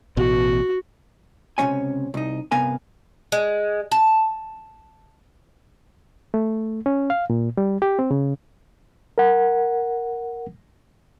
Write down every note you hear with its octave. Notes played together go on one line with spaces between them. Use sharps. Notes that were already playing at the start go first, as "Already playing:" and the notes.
A1 B2 F#4
C#2 C3 E3 C#4 C#5 G#5
C2 D#4
G2 C3 B3 A#4 F5 G#5
G#3
A5
A3
C#4
F5
A#2
G3
G4
C4
C#3
A#4 F#5